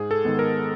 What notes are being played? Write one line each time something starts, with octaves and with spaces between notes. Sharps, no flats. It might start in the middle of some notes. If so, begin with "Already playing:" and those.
Already playing: G#2 G#4
A4
D#3 G#3 B3
A#4